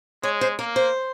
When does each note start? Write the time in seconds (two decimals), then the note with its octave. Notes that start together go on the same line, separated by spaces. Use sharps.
0.23 G#3 C#5
0.41 C5
0.59 A#3 A#4
0.76 C5